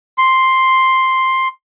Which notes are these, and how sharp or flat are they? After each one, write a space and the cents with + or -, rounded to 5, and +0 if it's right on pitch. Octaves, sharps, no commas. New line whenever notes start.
C6 +5